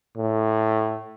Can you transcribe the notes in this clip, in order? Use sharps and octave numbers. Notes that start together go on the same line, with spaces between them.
A2